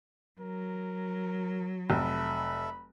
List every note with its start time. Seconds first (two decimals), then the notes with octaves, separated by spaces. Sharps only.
0.41 F#3 A#4
1.90 F1 A4 E5 B5